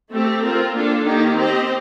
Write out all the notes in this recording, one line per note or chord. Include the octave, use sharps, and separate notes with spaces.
A3 C4 G4
C4 F4 A#4
A#3 D4 F4 A4
D#3 A#3 D#4 G4
C4 G4 C5 D#5